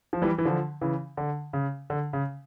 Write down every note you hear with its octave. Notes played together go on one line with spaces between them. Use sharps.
F3
E3 G3
E3
D3 F3
C#3 E3
D3
C#3
D3
C#3